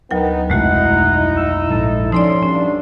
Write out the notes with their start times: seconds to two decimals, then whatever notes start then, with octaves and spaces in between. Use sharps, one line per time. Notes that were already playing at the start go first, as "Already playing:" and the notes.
0.11 D2 F#3 B3 D#4 A#4 G5
0.50 F1 B1 G#3 A3 D#4 E4 F#4 F#5
1.37 E6
1.71 A#1 G#2 A4
2.12 D2 F3 C#4 D#4 A4 D5 C6
2.43 E2 G2 C#4 D4